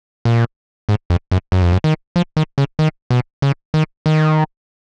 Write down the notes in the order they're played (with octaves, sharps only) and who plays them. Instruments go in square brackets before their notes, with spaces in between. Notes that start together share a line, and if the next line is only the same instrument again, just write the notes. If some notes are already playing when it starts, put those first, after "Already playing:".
[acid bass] A#2
G#2
F2
F#2
F#2
F2
F#2
D#3
F3
D#3
C#3
D#3
B2
C#3
D#3
D#3